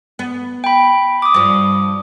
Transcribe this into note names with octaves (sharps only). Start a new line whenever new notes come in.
B3
G5 B5
D6 D#6
G2 F3